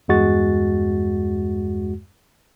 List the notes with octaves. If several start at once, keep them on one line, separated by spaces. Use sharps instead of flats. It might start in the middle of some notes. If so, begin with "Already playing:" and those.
E2 G2 G#3 F#4 A6